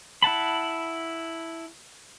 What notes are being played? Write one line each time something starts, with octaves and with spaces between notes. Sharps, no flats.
E4 F#5 A5 B5